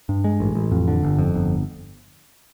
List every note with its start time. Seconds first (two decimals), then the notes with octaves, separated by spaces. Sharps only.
0.09 G2
0.24 G#3
0.40 A1
0.55 A1
0.71 F2
0.88 D3
1.03 G1
1.18 F2
1.34 G1